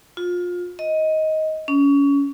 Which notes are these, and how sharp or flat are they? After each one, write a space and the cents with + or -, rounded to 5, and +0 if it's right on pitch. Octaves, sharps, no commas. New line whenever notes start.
F4 +25
D#5 +15
C#4 +25